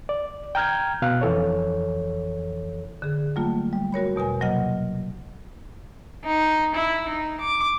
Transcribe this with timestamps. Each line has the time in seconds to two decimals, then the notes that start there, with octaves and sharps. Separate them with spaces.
0.09 D5
0.55 G5 A#5 F6 G6 G#6
1.02 B2 F5 F#6
1.21 F2 E3 A4 C#5
3.02 D3 G#4
3.36 F#3 G3 A3 A#3 F4
3.73 G3
3.93 F#4 A#4 C#5 B5
4.16 E2 B2 A#4 G#5
4.41 C3 F#3 A#3 D#5 F#5 F6
6.25 D#4
6.74 E4
7.08 D#4
7.40 D6